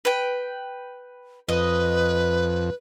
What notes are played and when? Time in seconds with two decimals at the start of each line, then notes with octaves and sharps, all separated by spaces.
0.05 B4 G5
1.49 F2 B4 D#5